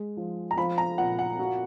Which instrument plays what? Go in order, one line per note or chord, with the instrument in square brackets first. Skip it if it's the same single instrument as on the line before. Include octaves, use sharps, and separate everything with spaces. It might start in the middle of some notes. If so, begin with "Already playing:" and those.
Already playing: [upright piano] G#3
F3
[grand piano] A#5
[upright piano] F3 [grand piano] B5
[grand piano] A#5
[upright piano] A#2 [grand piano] F#5
[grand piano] F#5
[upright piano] F#4